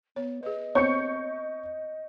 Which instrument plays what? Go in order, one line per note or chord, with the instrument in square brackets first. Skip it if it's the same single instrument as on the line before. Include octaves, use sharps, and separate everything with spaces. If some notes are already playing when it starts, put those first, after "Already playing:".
[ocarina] B3 [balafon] C#5
[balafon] G#4 B4 [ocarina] D#5
[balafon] B3 C4 C5 [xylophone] C#5 [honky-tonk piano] C#6 G6 C#7